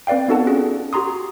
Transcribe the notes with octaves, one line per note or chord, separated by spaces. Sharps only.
C4 B4 D5 F5 G5
B3 D#4 F#4 A4 F#5 A5
C#4 F4 G#4
F#4 G4 A#5 C6 D#6